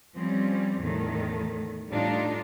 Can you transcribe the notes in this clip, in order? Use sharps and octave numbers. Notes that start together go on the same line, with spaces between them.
F3 G3 C4 C#4
E2 A2 D#3 A3
A2 G3 D4 D#4 F4